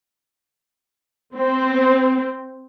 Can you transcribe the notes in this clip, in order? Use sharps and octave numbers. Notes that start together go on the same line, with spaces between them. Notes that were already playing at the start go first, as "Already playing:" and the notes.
C4